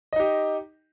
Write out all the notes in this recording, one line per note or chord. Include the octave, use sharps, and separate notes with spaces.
D#4 G4 D#5